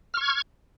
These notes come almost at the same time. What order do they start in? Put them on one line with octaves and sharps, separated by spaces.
F6 C#6 G#6